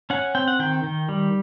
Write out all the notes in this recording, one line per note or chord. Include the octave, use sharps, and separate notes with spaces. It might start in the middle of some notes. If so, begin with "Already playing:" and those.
C#4 F#5
C4 G5
F#5
D#3 G5
D#3
G3